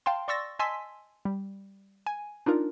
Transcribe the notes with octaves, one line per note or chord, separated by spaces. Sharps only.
F5 G5 A5 C6
D5 C6 C#6 E6 A6 A#6
D#5 G#5 A5 C6 E6 B6
G3
G#5
D4 D#4 F4 A#4